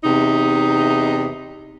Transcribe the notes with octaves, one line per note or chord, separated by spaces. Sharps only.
E2 C3 D#4